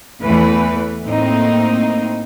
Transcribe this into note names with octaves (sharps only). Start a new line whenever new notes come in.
E2 E3 A3 B4
A2 A#3 C4 D#4